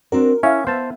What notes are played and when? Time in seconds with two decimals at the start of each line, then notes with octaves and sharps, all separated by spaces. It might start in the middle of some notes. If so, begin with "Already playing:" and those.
0.12 C4 D4 F#4 A#4
0.43 C#4 E4 E5 F5
0.67 B3 C5 A5